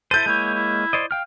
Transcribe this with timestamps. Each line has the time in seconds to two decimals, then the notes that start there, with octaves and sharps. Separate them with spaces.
0.11 E4 A4 C5 A5 G6 D#7
0.26 G#3 A#3 E4 C#5
0.54 E4
0.93 C5 D5 D#5
1.11 F5 G5 F6